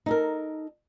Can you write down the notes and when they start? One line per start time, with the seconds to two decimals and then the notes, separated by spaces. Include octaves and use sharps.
0.06 D#4 A4 A#4